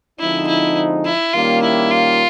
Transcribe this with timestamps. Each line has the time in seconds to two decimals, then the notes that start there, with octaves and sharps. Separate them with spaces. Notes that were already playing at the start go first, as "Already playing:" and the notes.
0.19 D3 F3 G#3 C4 D#4 E4
0.48 E4
1.06 E4
1.33 D#3 G3 A#3 C#4 F4
1.62 E4
1.91 F4